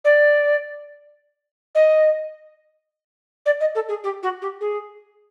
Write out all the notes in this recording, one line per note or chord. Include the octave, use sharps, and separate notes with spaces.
D5
D#5
D5
D#5
A4
G#4
G4
F#4
G4
G#4